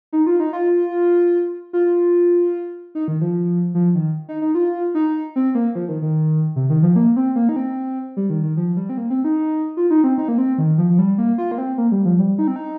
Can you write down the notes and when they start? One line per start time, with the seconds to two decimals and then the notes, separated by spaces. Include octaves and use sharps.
0.13 D#4
0.27 F4
0.40 D#4
0.53 F4
1.73 F4
2.95 D#4
3.08 D#3
3.21 F3
3.75 F3
3.95 D#3
4.29 D#4
4.42 D#4
4.55 F4
4.95 D#4
5.36 C4
5.55 A#3
5.75 F3
5.89 D#3
6.02 D#3
6.56 C3
6.70 D#3
6.82 F3
6.96 A#3
7.16 C4
7.36 A#3
7.49 D#4
7.56 C4
8.17 G3
8.30 D#3
8.43 D#3
8.57 F3
8.77 G3
8.89 C4
8.98 A#3
9.10 C4
9.24 D#4
9.77 F4
9.91 D#4
10.04 C4
10.18 D#4
10.28 A#3
10.38 C4
10.58 D#3
10.78 F3
10.90 F3
10.99 G3
11.18 A#3
11.38 F4
11.51 A#3
11.58 C4
11.78 A#3
11.92 G3
12.05 F3
12.19 G3
12.39 D#4
12.48 C4
12.56 D#4